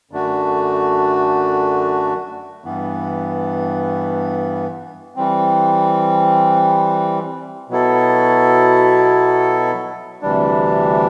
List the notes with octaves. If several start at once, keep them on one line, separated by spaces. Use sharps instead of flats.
F#2 D3 A3 D4 F#4
G2 E3 B3
E3 G3 C4
B2 F#3 B3 E4 A4
D2 C3 E3 G3 D4